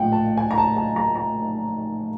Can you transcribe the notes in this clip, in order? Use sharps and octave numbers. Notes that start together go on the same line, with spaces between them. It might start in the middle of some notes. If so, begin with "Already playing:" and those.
Already playing: A#1 A2 F3 F#5 G5
A5
G#5
A#5
A5
A5
A#5
A#5